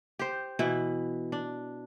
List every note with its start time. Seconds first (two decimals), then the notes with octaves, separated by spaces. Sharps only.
0.19 G4 C5
0.59 B2 E3 E4
1.32 D4